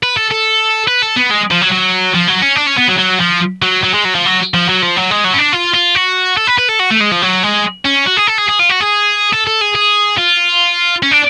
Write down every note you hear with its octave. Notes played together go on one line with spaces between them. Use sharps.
B4
A4
A4
B4
A4
B3
G#3
F3
F#3
F#3
F3
F#3
C#4
D4
C#4
B3
F#3
F#3
F3
F#3
F#3
G#3
F#3
F3
F#3
F3
F#3
F3
F#3
G#3
F#3
C#4
D4
F4
F4
F#4
A4
B4
B4
A4
F#4
A3
G#3
F3
F#3
G#3
C#4
F#4
G#4
A4
G#4
G#4
F4
F#4
G#4
A4
A4
G#4
G#4
F4
C#4
D4